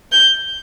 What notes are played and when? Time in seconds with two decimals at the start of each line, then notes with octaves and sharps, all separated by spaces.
0.12 G6